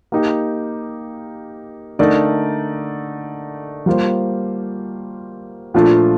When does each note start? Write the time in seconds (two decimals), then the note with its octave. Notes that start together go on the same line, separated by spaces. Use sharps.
0.12 A#3 D#4 G4
1.99 D3 A3 D#4 A#4 D5
3.86 G3 A#3 F4 C5
5.74 A#2 F3 A3 D4 F4